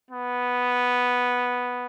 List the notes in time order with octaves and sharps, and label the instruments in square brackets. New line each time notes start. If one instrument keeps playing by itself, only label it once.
[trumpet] B3